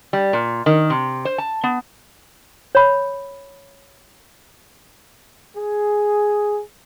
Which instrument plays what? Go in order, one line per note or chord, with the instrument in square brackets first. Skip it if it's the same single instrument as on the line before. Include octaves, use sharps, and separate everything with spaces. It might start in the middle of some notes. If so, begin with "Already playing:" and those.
[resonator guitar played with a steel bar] G3
A#2
D#3
C3
C5
A5
B3
[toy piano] C#5 B5
[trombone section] G#4